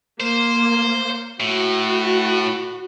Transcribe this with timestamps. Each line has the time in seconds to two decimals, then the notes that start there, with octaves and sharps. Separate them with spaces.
0.20 A#3 C5
1.40 A2 F#4